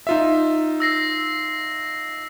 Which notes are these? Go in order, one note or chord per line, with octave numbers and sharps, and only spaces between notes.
D#4 F4 E5
E6 A#6 C7